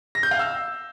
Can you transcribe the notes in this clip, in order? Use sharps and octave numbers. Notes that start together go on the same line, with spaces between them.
A#6
G6
F5
E6